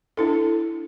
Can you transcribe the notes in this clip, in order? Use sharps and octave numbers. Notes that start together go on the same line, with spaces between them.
D4 E4 A4